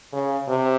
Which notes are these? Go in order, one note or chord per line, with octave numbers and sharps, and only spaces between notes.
C#3
C3